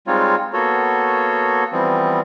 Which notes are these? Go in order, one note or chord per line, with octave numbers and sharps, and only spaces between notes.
G3 G#3 C4 D#4 F4 C#5
A#3 B3 F#4 A4 C#5
E3 F3 G3 B3 C4